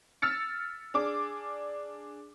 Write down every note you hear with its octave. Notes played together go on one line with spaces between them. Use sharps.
E6 F6 A6 C#7
D4 G#4 D6